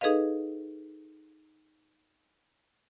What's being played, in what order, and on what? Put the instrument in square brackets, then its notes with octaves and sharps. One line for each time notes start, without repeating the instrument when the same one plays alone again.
[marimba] D#4 G#4 A4 B4 D#5 F5